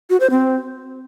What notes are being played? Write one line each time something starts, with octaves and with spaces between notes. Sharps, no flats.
F#4
C5
C4